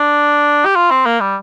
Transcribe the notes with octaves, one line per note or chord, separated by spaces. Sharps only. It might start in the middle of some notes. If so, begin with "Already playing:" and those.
Already playing: D4
G4
F4
C4
A#3
G3